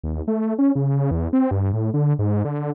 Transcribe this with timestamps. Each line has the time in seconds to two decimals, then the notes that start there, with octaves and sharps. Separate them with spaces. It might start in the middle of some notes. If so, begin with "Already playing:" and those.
0.04 D#2
0.28 A3
0.59 C#4
0.75 C#3
1.11 E2
1.33 C4
1.51 G2
1.73 A2
1.94 D3
2.19 G#2
2.45 D3